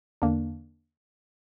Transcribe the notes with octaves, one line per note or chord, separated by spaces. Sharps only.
E2 D3 A#3 D4